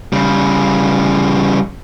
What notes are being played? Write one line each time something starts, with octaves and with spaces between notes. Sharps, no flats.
C#3 G3